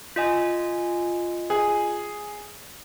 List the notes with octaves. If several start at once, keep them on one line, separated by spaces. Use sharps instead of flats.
F4 D#5 G#5
G#4